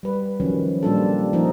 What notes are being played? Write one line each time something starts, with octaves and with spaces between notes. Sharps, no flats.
G3 B4
D#3 F3 F#3 C#4
A#2 G3 A#3 D4 F4 A4
F3 A#3 D#4 A4